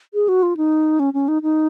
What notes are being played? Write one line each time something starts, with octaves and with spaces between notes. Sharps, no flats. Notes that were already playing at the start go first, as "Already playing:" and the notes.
G#4
F#4
F4
D#4
C#4
C#4
D#4
D#4